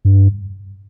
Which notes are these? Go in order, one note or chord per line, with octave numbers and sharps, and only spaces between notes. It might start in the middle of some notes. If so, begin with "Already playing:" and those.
G2